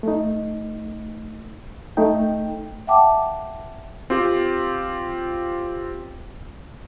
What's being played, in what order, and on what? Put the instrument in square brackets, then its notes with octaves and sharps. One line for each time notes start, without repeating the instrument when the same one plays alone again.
[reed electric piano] A3 D#4
A3 D#4 G5
[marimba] E5 F#5 G5 A5 D6
[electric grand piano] C4 F4 G4